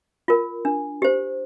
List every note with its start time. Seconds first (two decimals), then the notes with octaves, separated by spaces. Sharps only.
0.28 F4 A#4
0.65 D4
1.02 G4 C5